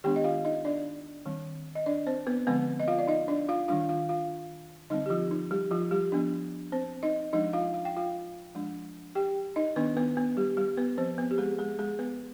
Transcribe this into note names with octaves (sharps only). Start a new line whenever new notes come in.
D#3 G#3 B3 D4 G4 G5
D#5
F4 F5
D#4 D#5
D4 D5
D#3 G3 C4
D#5
D4 D5
C4 C5
B3 B4
D3 F3 G#3 B3 C4 B4
D#5
F4 F5
D5
D#4 D#5
D4 D5
F4 F5
D#3 G3 D4 F4 F5
F4 F5
F4 F5
D3 G3 C4 D#4 D#5
G4
F3 F4
D#4
G3 G4
F3 F4
G3 G4
F3 B3 D4
C4 C5
D#4 D#5
F3 G#3 D4 D#4 D#5
F4 F5
F5
G5
F4 F5
F3 G#3 D4
G4 G5
D#4 D#5
D#3 B3 D4 B4
B3 B4
B3 B4
G3 G4
G3 G4
B3 B4
F3 C4 C5
B3 B4
G4
G#3 G#4
G#3 G#4
G#3 G#4
B3 B4